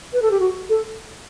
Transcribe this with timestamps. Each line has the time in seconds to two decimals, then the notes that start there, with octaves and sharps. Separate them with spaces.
0.13 B4
0.22 A4
0.31 G4
0.40 F#4
0.69 A4